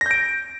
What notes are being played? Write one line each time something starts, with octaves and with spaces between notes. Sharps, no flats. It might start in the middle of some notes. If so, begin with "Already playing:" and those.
G6 A#6 D7